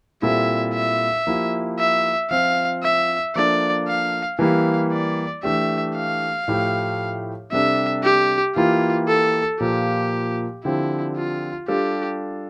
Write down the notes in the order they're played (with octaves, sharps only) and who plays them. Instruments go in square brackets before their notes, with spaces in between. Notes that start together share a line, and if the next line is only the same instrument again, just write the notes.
[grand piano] A#2 G3 C4 E4 A4 [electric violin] E5
[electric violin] E5
[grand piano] F3 A#3 E4 G4
[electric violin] E5
[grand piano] F3 C4 F4 [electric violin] F5
[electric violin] E5
[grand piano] F3 A#3 D4 A4 [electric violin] D5
[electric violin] F5
[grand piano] E3 G3 A#3 E4 [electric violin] F5
[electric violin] D5
[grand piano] E3 A3 D4 G4 [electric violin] E5
[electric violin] F5
[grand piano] A2 F3 A3 E4 G4
[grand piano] C3 G3 D4 A4 [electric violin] E5
[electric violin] G4
[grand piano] E3 A#3 E4 G4 [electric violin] F4
[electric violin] A4
[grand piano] A#2 F3 A#3 [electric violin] G4
[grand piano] D3 F3 C4 G4 [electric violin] E4
[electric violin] F4
[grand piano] G3 D4 F4 A4 [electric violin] G4